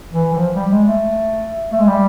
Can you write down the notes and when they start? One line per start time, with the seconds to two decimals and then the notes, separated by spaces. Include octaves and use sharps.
0.13 E3
0.33 E3
0.37 F3
0.54 G3
0.71 G#3
0.87 A3
1.72 A3
1.80 G#3
1.87 G3